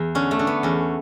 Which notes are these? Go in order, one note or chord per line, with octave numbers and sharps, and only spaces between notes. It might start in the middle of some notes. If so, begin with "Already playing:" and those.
Already playing: E2
D3 C#4
A3
D3
B3
E2 C#4